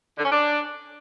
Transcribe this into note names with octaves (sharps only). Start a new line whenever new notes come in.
D3
C#4
D4